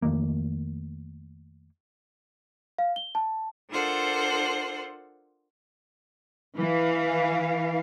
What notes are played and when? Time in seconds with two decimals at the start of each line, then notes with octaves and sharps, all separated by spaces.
0.02 F2 D#3 A3 A#3
2.79 F5
2.96 G7
3.15 A5
3.69 D4 F4 A4 A#4 C5 F#5
6.57 E3 F5